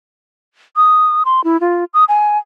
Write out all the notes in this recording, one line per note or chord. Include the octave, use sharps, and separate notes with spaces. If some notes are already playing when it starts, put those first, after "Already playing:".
D#6
C6
E4
F4
D#6
G#5